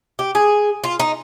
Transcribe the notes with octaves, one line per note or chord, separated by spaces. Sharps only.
G4
G#4
F4
D#4